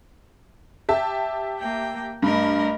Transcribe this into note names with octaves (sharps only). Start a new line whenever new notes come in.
G4 E5 A5
A#3 G5
G2 A3 A#4 D#5